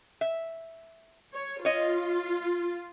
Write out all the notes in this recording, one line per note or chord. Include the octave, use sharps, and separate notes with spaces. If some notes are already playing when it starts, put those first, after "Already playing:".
E5
C#5
F4 C#5 D#5